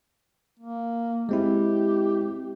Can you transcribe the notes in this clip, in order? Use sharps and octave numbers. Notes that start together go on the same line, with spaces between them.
A#3
G#3 C4 E4 G4